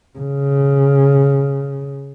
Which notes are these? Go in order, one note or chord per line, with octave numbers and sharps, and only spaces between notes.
C#3